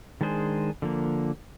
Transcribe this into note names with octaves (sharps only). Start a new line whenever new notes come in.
D#3 G#3 D4 G#4 C5
D3 F3 A#3